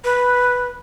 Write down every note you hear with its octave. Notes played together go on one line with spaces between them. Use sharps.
B4